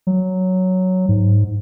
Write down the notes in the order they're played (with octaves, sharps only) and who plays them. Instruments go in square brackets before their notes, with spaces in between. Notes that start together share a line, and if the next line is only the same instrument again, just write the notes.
[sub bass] F#3
G#2